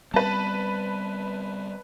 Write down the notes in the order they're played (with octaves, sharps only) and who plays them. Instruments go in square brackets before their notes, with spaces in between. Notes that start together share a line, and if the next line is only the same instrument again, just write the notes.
[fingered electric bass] G3 B3 C4 [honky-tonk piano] B4 A5